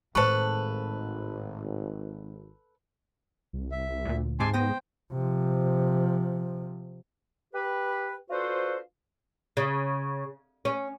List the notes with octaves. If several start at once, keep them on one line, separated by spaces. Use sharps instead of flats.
G#1 A2 A4 B4 C5 C#6
C2
E5
D2 A#2
G#2 C3 G#3 G#5 A5 C6 D6
B3 C5 G5 D#6 A#6
C3 F3
G4 B4
D4 F4 F#4 A4 B4 C5
C#3
C#4